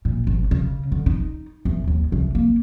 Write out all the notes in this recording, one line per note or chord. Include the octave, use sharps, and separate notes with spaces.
A#2
G#1
C#3
D3
D#4
E2
D#2
C2
A#3